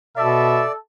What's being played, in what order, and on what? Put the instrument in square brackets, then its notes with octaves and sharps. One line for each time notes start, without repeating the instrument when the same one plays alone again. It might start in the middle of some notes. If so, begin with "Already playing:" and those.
[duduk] B2 [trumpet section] A4 [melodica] D5 [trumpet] E5